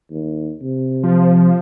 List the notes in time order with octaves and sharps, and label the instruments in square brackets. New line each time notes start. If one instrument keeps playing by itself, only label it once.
[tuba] D#2
C3
[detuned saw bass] F3